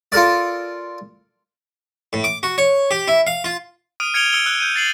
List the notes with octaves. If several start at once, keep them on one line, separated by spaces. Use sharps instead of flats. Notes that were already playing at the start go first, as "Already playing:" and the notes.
F4 A4 A#4 D5
A2
D6
F#4
C#5
G4
E4
F5
F4
D#6 F6 D7 D#7
F6 G#6 C#7 D7 F7 G7
E6 C#7 D7 G7
E6 F#6 D7 G7
G6 D#7
A6 C7 F#7